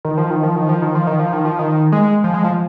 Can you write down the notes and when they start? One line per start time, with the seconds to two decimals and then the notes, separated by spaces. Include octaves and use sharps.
0.05 D#3
0.18 F3
0.30 D#3
0.43 F3
0.56 D#3
0.69 F3
0.82 D#3
0.95 F3
1.07 D#3
1.19 F3
1.33 D#3
1.45 F3
1.59 D#3
1.92 G#3
2.24 F3
2.34 G#3
2.44 F3